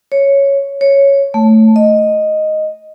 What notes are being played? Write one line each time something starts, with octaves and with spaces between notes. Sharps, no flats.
C#5
C#5
A3
D#5